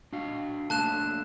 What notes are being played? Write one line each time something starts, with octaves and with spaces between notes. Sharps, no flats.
D4 F#4 F5
A3 A#3 D4 A5 F#6 E7